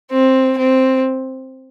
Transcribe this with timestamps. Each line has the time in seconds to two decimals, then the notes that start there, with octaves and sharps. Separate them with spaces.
0.11 C4
0.58 C4